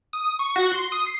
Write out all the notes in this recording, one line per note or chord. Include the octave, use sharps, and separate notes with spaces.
D#6
C#6
F#4
C6
D#6
C7